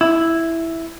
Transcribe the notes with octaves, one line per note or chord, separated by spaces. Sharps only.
E4